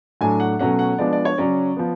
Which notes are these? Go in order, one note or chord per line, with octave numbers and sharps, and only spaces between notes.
A2 F#3 A3 D4 G#5
F#5
B2 F#3 A3 C#4 F#5
F#5
F3 G#3 B3 D4 D5
D5
C#5
C#3 F#3 C#4 D5
F3 B3